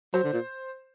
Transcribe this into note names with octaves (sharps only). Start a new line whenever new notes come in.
F#3 C5
D3
A#2